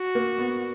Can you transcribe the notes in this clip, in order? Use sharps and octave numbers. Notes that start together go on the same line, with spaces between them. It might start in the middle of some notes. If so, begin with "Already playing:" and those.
Already playing: F#4
A#3
B3